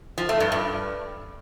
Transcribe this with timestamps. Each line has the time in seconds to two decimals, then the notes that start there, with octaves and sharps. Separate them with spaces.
0.18 F3
0.29 A3
0.40 G2
0.52 G2